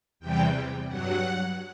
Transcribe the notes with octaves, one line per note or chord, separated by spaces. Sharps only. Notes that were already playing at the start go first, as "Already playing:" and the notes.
E2 C3 E3 G3 G5
G2 F#3 F#5